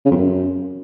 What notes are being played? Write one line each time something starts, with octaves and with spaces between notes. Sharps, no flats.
C#3
F2
F#2